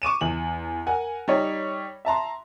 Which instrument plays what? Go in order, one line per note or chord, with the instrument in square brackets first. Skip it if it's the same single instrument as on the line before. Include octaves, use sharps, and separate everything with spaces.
[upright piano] C#6 D6 D#7 E7
E2 F#7
A#4 F#5 G#5
G3 D#4 C#5
E5 A5 A#5 C6